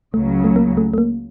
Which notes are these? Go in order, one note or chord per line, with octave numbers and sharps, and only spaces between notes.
C#2 C#3 F#3 A3
A3
A#3
A3
A3
A#3